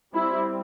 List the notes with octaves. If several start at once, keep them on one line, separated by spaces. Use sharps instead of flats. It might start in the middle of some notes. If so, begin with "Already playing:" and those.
G3 C4 E4